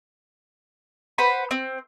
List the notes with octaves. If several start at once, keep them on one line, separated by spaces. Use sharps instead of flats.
B4 C5 F#5 B5
C4